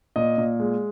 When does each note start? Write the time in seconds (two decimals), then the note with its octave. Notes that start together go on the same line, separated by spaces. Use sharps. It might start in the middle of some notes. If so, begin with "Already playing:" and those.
0.16 A#2 D#5
0.38 A#2
0.60 G#3